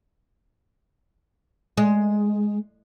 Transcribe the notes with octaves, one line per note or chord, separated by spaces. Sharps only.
G#3